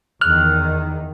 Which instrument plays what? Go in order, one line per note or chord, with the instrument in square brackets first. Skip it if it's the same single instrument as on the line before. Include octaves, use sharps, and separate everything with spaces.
[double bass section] E2 D#3 [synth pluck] F6 F#6